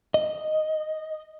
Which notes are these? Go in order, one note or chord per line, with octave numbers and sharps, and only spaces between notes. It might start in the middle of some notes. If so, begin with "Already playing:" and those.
D#5